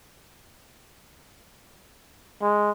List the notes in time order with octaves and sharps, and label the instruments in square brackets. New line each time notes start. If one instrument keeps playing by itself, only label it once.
[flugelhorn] G#3